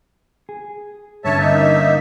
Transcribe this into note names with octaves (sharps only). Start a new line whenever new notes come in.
G#4
G2 D3 C#4 C#5 E5 A5
A#3 D#4 E5